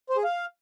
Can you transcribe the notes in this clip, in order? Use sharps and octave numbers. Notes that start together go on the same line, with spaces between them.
C5
G#4
F5